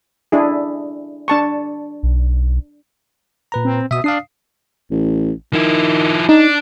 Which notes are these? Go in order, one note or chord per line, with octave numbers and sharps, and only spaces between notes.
D4 E4 G#4
D4 A5 C#6
B1
A#2 B4 A#5
C4
B2 E5 D#6
D4 F5 D#6 C7
A1
D#3 F3 E4
D4 D#4